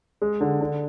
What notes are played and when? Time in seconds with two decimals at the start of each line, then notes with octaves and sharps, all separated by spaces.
0.22 G#3
0.41 D3
0.61 D3